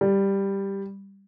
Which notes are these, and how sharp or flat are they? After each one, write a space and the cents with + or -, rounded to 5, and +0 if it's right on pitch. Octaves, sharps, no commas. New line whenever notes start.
G3 +5